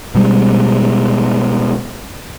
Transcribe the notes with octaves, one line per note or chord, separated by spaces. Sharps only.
B2 G3 G#3